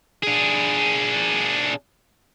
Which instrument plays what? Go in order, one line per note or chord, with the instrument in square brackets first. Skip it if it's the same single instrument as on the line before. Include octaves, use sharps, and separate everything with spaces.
[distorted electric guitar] D4 G#4